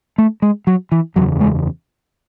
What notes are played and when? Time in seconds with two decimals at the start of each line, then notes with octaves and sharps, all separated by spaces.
0.18 A3
0.42 G#3
0.67 F#3
0.92 E3
1.16 F#1 E2 C#3 F#3
1.41 G#3